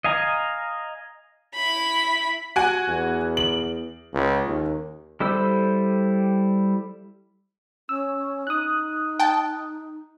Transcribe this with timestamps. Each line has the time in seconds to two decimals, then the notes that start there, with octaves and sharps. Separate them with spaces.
0.04 D#5 F5 G#5 A#5
1.54 E4 B5
2.56 F#4 G#5
2.88 E2
3.37 F#7
4.13 C#2
4.47 D#2
5.20 G3 E4 A4 C5 E6
7.89 C#4 E6
8.47 D#4 D#6 F#6
9.20 G5 A5